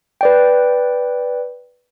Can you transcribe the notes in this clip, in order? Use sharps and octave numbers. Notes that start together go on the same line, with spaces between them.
B4 D5 G5